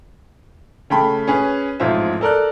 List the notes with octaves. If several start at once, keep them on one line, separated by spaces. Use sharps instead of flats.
C#3 A3 G5 A5 B5
C#4 G#4 B4
A1 F2 G#2 F4 C5 E5
A4 A#4 D5 F#6